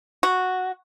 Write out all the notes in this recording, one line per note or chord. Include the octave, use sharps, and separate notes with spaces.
F#4